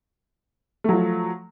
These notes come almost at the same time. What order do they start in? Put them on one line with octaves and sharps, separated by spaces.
A3 F#3 F3